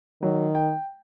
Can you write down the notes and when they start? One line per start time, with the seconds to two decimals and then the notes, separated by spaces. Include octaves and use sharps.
0.23 D#3 F#3
0.55 G5